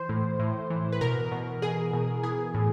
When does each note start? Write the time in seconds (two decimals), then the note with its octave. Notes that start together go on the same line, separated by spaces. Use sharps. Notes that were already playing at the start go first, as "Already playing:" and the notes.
Already playing: E3 C5
0.09 A2
0.39 A2
0.70 E3
0.92 B4
1.01 B2 A#4
1.31 B2
1.62 B2 G#4
1.93 B2
2.23 E3 G#4
2.54 A2